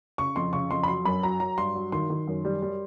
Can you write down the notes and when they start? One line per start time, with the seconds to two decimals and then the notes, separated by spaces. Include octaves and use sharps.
0.18 C#3 C#6
0.36 F2 C6
0.53 C#3 C#6
0.71 F2 C6
0.83 B5
0.88 F#3 C6
1.05 F#2 B5
1.23 F#3 A#5
1.40 F#3 A#5
1.57 G2 C6
1.75 F#3
1.92 D#3 C6
2.10 D#3
2.27 F#2
2.45 G3
2.62 G3